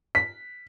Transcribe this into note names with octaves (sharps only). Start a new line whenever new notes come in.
B6